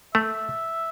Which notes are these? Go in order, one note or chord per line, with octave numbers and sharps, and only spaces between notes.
A3 E5